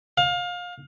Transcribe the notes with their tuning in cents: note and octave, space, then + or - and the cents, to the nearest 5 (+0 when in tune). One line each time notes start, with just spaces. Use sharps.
F5 +25